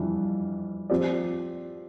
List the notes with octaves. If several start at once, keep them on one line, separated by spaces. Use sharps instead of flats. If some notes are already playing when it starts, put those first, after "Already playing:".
Already playing: F2 E3 G3 D4 F4
F3 C4 G4 D5